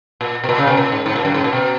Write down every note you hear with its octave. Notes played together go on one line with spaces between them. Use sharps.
A#2
B2
A#2
C#3
B2
A#2
G#2
G#2
A#2
F#2
G#2
A#2
B2